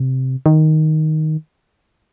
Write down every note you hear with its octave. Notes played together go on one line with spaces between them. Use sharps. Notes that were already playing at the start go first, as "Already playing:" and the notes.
Already playing: C3
D#3